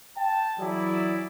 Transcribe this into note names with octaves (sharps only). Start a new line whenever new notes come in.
G5 A5
E3 F#3 E4 G#4 D5